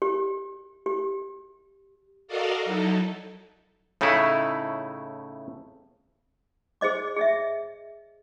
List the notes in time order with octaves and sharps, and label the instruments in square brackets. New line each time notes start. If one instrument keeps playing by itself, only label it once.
[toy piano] G4
G4
[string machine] F#4 A4 A#4 D5 D#5 F5
F#3 D#4 E4 A4
[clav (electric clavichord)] A2 C#3 A3 D#4 E4
[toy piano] G#4 C5 D#5 D6
G#4 D#5 E5